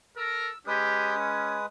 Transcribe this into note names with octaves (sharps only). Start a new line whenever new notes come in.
A4 A#4 E6
G#3 C#4 G4 B4 D#6
C#4